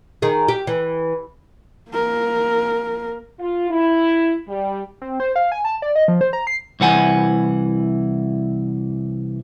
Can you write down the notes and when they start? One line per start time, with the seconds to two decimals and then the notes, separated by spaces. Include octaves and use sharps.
0.22 D#3 G#4
0.48 G4
0.67 E3
1.91 A#3 A#4
3.39 F4
3.71 E4
4.48 G3
5.02 C4
5.20 C5
5.36 F5
5.52 G#5
5.65 A5
5.82 D5
5.96 D#5
6.08 F3
6.21 C5
6.33 A#5
6.47 C7
6.80 C2 E3 F#5 G#5